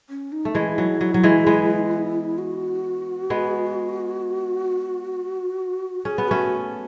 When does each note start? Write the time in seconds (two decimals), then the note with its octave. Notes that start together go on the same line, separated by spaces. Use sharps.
0.09 C#4
0.32 D#4
0.45 A3
0.55 E3 G#3 E4
0.78 F#3
1.01 F#3
1.14 F#3
1.23 E3 G#3
1.47 G#3 B3
2.38 F#4
3.30 G#3 B3
6.05 C#4 G#4
6.18 B3
6.28 A3 C#4 F#4